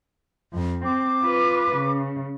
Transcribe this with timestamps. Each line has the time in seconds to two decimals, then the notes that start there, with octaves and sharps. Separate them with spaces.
0.53 F2
0.85 C4 D6
1.24 F4 B4
1.76 C#3